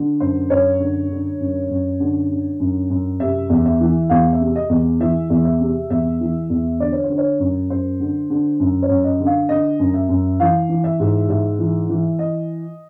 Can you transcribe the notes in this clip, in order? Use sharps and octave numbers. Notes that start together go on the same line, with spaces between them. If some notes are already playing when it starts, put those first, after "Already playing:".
Already playing: D3
F#2 C5
F#2 C#5
D3
D3
F#2
F#2
D3
D3
F#2
F#2
C3 E5
E2
E5
E3
E2 F5
E5
C3
D#5
E2
E3 E5
E2
E5
C3
E2 E5
E3
E2
D3 D5
C#5
C5
D3
C#5
F#2
F#2 C5
D3
D3
F#2
C#5
F#2
D#5
D3
F5
D3 D#5
F#2
E5
F#2
E3 F5
E3
E5
G#2
G#2 E5
E3
E3
D#5